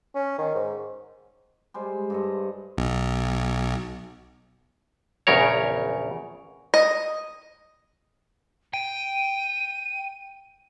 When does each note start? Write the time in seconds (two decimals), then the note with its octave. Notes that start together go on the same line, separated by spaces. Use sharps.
0.15 C#4
0.38 D#3
0.55 G#2
1.74 G3 G#3 C5
2.10 G2 A4 D#5
2.78 B1
5.27 A#1 E2 C#3 A#4 C#5
6.74 D#5
8.74 G5 D#7